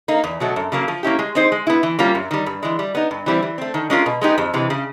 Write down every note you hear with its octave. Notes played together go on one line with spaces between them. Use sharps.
A#3 D#4
E2
B2 F#3 A3
F#2
C#3 F#3 A#3
F3
A#3 C#4 E4 G4
G#3
C4 D#4 G#4 C5
G#3
B3 E4
E3
G3 A#3 C#4 F4
F#2
D#3 G3
G2
E3 G#3
G3
B3 D#4
G2
E3 G3 C4 E4
E3
A3 C4
D#3
G#3 C#4 F4 A#4
B2
G#3 B3 D#4 G4
F2
C3 E3 G#3
C#3